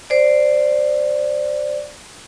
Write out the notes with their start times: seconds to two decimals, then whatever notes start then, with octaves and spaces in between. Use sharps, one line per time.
0.10 C5 D5